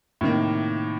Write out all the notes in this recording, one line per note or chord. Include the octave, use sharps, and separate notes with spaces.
A2 C3 D#3 A#3